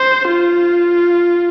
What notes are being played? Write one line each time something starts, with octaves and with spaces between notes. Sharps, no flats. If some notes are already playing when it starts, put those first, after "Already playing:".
Already playing: C5
F4